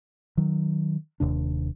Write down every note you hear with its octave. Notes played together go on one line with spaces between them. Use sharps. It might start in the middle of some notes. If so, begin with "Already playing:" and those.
D#3 F#3
D#1 D#2 C3 D4